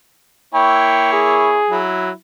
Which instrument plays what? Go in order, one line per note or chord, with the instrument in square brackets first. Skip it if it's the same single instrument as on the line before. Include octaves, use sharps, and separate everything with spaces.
[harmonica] A#3 E4 C#5 [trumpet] G5
[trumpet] G#4
[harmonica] F#3 E4